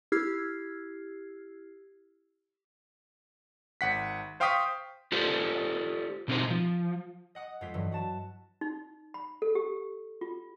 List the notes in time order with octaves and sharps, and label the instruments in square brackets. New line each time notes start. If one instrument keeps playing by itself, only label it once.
[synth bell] E4 G4 E6 F6 G#6 C7
[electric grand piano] G#1 F#5 B6
C5 F5 G5 C#6 D#6 B6
[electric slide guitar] F4 G4 A4 C5 D5
B2 C4 D#4 C5
F3
[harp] D#5 F#5 D#6
F2 G#3 F4 G4 B6
G2 E3 F#3
F#4 A5 E7
[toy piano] D#4
B5
A4
G4
F4